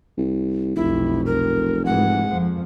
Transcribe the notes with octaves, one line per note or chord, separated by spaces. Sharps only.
C2
F1 B1 F2 E4
A#4
G#2 E3 G#3 F#5
F2 F3